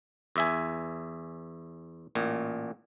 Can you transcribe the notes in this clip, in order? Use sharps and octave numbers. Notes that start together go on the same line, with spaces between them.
E2 E5 G#5
A1 A#2